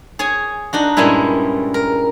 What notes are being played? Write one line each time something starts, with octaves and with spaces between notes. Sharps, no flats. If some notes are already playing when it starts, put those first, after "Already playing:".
G#4 C#5 G#5
D4 D#4 F#4
G2 A#2 G3 G#3 C#4 E4
A#4